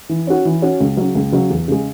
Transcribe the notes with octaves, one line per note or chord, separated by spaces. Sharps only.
E3
C#4 F#4
E3
C#4 F#4
C#2
C#3 F#3
C#2
C#3 F#3
E2
C#3 G#3